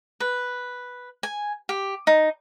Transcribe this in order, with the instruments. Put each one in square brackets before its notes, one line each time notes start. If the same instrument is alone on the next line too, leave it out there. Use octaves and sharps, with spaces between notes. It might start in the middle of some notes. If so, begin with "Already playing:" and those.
[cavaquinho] B4
G#5
G4
D#4